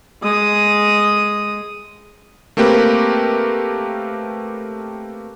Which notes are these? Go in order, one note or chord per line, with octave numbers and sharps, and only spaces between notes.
G#3 D#6
A3 A#3 C4 G4 A#4 B4